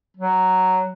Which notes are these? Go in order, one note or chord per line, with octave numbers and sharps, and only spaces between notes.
F#3